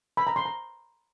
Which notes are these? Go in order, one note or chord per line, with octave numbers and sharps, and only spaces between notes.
B5
A#5
C6
A#5